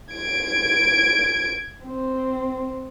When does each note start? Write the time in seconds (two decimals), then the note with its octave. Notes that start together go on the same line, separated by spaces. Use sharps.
0.14 G#6 D7
1.85 C4